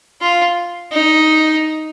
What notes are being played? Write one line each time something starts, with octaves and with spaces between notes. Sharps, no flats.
F4
D#4